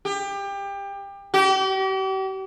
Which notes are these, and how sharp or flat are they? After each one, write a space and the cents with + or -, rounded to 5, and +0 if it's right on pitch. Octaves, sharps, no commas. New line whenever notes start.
G4 +25
G4 -40